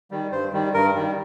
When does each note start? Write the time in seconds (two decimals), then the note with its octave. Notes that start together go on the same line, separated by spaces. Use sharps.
0.11 D#3 G3
0.32 G2 C5
0.53 D#3 G3
0.74 G2 A#4
0.95 D#3 G3